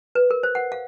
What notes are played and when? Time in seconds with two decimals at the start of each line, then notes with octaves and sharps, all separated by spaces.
0.15 B4
0.31 A#4
0.43 C5
0.55 F#5
0.72 F5